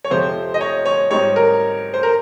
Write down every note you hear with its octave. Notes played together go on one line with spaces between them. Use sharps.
C#5
F2 C3 F3 G#3 C4 C5
D#5
C#5
C#5
G#2 G3 C4 D#4 C#5
A#4
C5
A#4